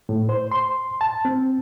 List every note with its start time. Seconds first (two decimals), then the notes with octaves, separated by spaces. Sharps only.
0.09 A2
0.29 C5
0.51 C6
1.01 A5
1.25 C4